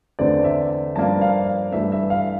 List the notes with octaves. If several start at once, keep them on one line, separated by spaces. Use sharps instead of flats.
E2 D3 A3 C4 D5
E5
G2 F3 A#3 D4 A5
F5
G2 E3 A3 E5
E5
F5